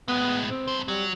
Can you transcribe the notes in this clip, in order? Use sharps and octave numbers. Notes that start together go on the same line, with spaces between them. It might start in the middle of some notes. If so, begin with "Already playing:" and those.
A2 G#3 B3
C4
G2 C5
F#3 G3